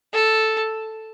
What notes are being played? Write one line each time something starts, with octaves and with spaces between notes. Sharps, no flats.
A4